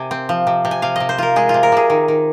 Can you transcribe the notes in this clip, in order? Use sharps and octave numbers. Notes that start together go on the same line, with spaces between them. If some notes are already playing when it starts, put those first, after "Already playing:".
Already playing: C3 G#5
C4
F3
C3
C3
G#5
C3 F5
C3 D#5
C5
F4 A#4
G#3 G#4
F4
C3
A#4
C3 G#4
D#3
D#3